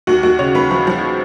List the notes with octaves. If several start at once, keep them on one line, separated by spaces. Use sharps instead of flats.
D#2 F#4
D#2 F#4
C#3 C#5
D#2 B4
F3
F3